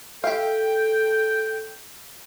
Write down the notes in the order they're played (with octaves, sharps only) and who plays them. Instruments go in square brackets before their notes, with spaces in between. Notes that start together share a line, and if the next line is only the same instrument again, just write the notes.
[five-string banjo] G4 E5 F5 [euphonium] A4 [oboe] G5